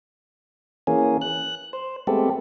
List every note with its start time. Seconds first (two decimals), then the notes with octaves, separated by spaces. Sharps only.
0.87 E3 A#3 C#4 G#4
1.21 F#6
1.73 C5
2.07 G#3 A3 B3 C4 G4 A4